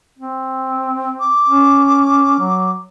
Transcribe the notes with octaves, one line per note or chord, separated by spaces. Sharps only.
C4
D6
C#4
F#3